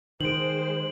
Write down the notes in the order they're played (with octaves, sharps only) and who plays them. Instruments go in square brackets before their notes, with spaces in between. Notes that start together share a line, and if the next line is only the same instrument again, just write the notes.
[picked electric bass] D#3 [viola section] G#3 C5 [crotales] D7 F#7